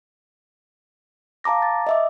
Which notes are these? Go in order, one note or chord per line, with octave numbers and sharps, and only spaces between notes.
F5 A5 A#5 D6 A#6
A6
D#5 E5 D6